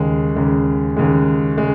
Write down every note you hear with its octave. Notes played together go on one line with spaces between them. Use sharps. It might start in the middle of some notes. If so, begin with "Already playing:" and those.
Already playing: D#2 C#3 G#3
D#2 C#3 G#3
D#2 C#3 G#3
C#3 G#3